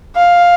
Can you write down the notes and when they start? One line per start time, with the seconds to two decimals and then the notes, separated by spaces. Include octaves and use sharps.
0.16 F5